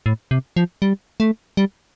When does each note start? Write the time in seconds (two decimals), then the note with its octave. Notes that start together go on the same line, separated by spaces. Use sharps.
0.06 A2
0.31 C3
0.56 F3
0.82 G3
1.20 A3
1.57 G3